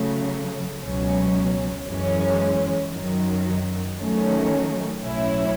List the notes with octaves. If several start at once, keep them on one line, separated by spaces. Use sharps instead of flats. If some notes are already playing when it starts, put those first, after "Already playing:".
Already playing: C#3 F#3 A3
C#2 B2 F#3 C#4
F#2 E3 G#3 C#4
F#2 D#3 F#3
D#3 F#3 A3 C#4
B1 A2 F#3 C#4 E4